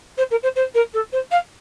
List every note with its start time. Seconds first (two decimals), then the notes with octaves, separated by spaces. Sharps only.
0.17 C5
0.31 A#4
0.43 C5
0.56 C5
0.74 A#4
0.93 A4
1.12 C5
1.31 F5